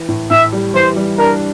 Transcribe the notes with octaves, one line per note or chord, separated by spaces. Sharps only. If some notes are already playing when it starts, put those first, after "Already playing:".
Already playing: E3
A2
A2 E5
G3
E3 C5
G3
D4 A#4